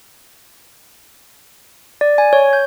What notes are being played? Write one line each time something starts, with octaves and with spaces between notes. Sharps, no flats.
D5
G#5
C#5
G6